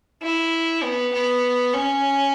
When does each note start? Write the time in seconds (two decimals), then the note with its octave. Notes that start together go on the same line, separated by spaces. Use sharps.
0.22 E4
0.83 B3
1.13 B3
1.73 C#4